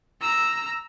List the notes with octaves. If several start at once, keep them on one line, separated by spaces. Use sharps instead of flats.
A#5 E6